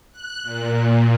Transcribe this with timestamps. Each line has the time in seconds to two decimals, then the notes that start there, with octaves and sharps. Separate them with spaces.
0.12 F#6
0.43 A#2